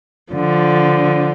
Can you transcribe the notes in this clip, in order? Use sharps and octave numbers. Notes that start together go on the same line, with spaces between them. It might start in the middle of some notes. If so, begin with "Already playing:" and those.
D3 F3